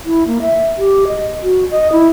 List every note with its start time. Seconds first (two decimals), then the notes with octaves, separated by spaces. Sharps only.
0.05 E4
0.27 A#3
0.41 E5
0.78 G4
1.07 D#5
1.43 F#4
1.71 D#5
1.92 E4